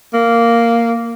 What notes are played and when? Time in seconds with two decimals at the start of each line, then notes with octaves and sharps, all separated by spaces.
0.14 A#3